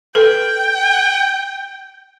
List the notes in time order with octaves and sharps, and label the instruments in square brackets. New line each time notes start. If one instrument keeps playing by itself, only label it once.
[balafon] A4 B4 [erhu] G5